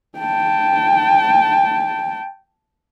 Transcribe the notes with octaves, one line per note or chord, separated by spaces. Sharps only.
G5 A5